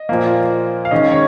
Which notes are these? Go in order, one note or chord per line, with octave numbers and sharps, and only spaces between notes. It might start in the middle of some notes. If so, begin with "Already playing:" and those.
Already playing: D#5
A#2 F3 A#3
F5
D#3 G#3 C#4 D#5
C#5